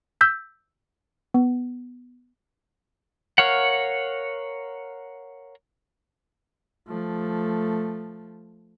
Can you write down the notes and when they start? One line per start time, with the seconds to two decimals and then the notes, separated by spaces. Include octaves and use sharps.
0.21 E6 G6 B6
1.34 B3
3.38 A#4 C#5 F5 F#5
6.88 F3 A3